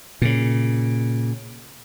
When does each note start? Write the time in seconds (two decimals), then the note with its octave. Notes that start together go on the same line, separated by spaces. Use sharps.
0.22 A#2 C#3